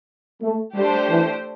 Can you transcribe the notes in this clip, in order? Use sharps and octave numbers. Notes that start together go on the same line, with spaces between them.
A3
G3 A3 D4 G4 C5
E3